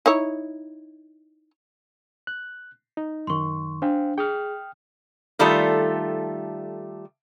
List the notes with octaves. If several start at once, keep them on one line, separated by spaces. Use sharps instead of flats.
D#4 E4 C#5
F#6
D#4
F#2 D#3 C6 C#6
D4 C5 F5 G5
G#4 G5 D#6 F6
D#3 G3 A3 F4 A4